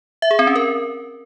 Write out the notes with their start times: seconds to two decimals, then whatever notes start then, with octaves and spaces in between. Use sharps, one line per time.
0.22 E5
0.31 G#4
0.39 C4
0.47 C#4
0.56 A#4